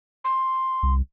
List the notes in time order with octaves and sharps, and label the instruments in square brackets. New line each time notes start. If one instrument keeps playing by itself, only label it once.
[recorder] C6
[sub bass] C2